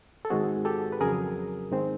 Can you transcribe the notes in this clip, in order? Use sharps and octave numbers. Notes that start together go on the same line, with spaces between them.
A4
G#2 D#3 G#3 C4 F#4 G#4
G4 A4
B4
F2 C#3 F#3 G#4 A#4
G#2 D#3 G#3 C4